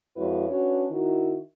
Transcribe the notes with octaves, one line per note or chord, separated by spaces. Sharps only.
F2 G#3 E4 F#4 B4 C#5
C#4 D4 F#4 B4 C#5
D#3 E4 F#4